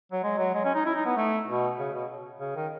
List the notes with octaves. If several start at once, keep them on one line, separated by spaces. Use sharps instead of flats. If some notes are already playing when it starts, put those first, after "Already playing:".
F#3
G#3
F#3
G#3
C#4
D#4
E4
D#4
B3
A3
B2
C#3
B2
C#3
D#3